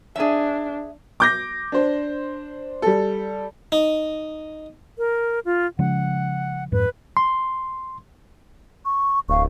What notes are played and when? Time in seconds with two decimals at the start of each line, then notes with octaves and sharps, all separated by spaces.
0.16 D4 G#4 E5
1.20 D6 G6 A#6
1.72 D4 C5
2.82 G3 A4
3.72 D#4
4.98 A#4
5.45 F4
5.79 C#3 F3 G#3 F#5
6.72 F2 G#2 B4
7.17 C6
8.84 C#6
9.28 D1 F5 C#6